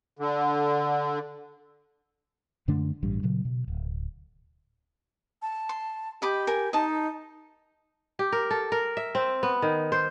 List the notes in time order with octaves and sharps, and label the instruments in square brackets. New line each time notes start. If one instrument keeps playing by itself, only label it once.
[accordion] D3
[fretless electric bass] F#2 D3 A3 D4
A1 G2
A#2 C#3 F#3
B2
D1
[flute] A5
[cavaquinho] C6
[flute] G4 [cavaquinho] D#5 B5 D6
[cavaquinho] A#4 G#5
[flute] D#4 [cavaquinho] D#5 A5
[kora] G4
A#4
A4
A#4
E5
C4
B3
D#3
C5